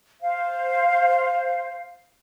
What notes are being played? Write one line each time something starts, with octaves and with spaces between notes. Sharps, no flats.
C5 F5